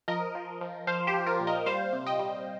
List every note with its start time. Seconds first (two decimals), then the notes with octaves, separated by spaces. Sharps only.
0.08 F3 A#4 D#5
0.35 F3
0.61 F3
0.87 F3 C5 F5
1.07 G4 C5
1.14 F3
1.27 F4 A#4
1.40 A#2
1.47 A#4 D#5
1.66 G3 C5 F5
1.93 C3
2.06 D#5 G5
2.20 G3